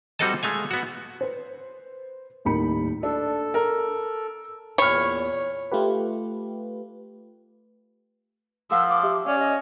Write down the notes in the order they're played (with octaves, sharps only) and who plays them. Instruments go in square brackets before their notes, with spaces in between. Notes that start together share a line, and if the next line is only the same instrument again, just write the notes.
[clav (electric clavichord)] G3 C4 F#4 A4 D#5 A5
G#3 A3 F5 G#5
B3 F#4
[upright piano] B4 C5
D#1 A2 D#4 A#4 B5 C#7
[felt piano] D4 [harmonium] A4
[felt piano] A#4
[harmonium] E2 A#2 [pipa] C#5 [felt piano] B5 F6
[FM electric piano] A3 F4 G4 B4
[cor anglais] F3 [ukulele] A#4 F5 F#5 [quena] E6
[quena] D6
[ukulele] G4 E5
[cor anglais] C#4 [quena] D5 [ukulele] F5
[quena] D#5